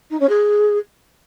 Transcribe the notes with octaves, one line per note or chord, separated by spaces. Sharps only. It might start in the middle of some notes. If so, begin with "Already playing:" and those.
D#4
C#4
G#4